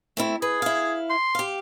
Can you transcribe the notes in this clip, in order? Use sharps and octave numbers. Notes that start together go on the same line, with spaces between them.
A3 C4 E4
G#4 B4
E4 F5
C6
G4 F5